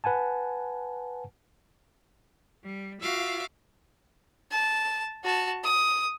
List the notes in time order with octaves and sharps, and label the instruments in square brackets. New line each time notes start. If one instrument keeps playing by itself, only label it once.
[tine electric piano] B4 F#5 G#5 A5
[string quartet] G3
F4 F#4 E5 F5 D6
[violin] A5
F#4 A5
D#6